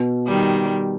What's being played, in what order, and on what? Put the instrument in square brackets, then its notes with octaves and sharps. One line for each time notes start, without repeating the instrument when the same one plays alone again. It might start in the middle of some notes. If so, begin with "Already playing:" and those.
Already playing: [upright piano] B2
[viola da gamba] D#3 G3